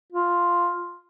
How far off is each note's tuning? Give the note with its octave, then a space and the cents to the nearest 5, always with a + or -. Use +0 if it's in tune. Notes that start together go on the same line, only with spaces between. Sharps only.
F4 +0